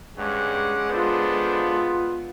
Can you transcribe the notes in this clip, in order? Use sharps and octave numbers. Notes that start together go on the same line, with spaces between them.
G2 G#3 C#4 F#5 D6
B3 D4 F4 A4 C5